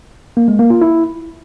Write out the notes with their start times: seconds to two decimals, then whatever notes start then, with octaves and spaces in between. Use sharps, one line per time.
0.37 A#3
0.48 G#3
0.59 A#3
0.70 F4
0.81 E4